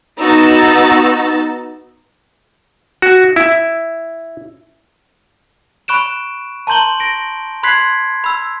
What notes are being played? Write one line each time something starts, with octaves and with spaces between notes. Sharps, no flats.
B3 D#4 F#4 E6 A6
F#4
E4
B5 C#6 F#6 D7 E7
A5 A#5 C6 G6 F#7 G7
A#6 D7
B5 C6 F#6 G#6 B6 C7
B5 E6